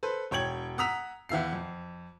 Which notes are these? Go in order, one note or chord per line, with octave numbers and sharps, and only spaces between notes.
A4 B4 C5
E1 C#5 G5 G#6 F#7
F#5 A#5 D#6 E6 B6 F7
E2 E3 E5 F5 C7
F2